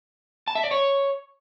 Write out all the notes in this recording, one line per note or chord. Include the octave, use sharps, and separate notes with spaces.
A5
E5
D5
C#5